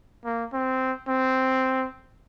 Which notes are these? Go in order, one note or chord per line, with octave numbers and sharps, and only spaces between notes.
A#3
C4
C4